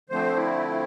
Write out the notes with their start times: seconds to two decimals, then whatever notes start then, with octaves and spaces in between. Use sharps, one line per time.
0.10 D3 F3 A3 C4 C5
0.36 E4